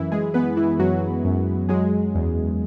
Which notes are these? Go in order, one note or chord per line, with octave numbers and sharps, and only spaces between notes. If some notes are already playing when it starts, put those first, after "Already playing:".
Already playing: F#2 E3 E4
G#3 G#4
E3 B3 B4
E3 E4
F#2 F#3 F#4
F#2
F#3 G#3 G#4
E2